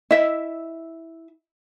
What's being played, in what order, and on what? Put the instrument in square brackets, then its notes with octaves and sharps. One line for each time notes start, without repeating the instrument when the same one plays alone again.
[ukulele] E4 E5 [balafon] D#5